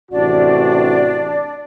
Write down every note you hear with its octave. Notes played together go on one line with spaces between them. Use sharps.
A1 C3 D4 F#4 D5